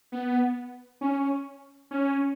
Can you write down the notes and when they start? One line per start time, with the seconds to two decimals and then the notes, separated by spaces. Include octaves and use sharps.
0.12 B3
1.01 C#4
1.91 C#4